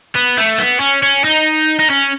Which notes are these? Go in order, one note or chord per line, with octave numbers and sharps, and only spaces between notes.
B3
A3
B3
C#4
C#4
D#4
D#4
C#4